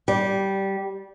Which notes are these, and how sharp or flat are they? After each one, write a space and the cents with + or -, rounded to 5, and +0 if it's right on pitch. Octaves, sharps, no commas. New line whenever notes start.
G3 -10